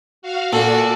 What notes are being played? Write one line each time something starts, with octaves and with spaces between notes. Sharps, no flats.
F#4 F5
A#2 F#4 A4 D5